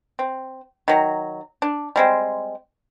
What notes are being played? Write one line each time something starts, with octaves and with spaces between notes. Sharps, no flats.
C4
D#3 F#3 A#5
D4
G3 G#3 C4